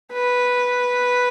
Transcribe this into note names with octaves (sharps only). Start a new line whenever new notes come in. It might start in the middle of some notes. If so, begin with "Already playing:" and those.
B4